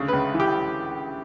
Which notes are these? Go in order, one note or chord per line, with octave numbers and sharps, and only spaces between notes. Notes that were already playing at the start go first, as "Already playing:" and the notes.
Already playing: D2 C#3
B4
C#2
E3
G4